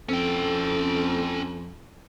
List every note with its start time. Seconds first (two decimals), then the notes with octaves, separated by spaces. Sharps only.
0.09 F2 C4 C#4 A4 G5